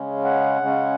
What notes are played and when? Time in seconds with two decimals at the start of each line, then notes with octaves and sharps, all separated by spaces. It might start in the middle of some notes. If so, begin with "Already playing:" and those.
Already playing: C#3 G#3 C#4
0.24 F#5
0.61 C#3 G#3 C#4